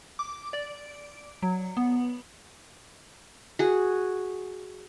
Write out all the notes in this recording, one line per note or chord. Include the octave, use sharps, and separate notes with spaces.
D6
D5
F#3
B3
F#4 G#4